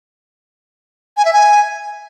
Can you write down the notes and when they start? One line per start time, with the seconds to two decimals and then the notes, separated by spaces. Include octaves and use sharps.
1.17 G#5
1.25 E5
1.33 G#5